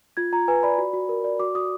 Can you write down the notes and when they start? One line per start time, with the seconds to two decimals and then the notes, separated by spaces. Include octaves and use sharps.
0.17 F4 G#6
0.33 F4 A#5
0.48 B4 G#5
0.63 D5 B5
0.78 F#4
0.93 F#4
1.09 A#4
1.24 D5
1.40 F#4 D6
1.55 F#4 D#6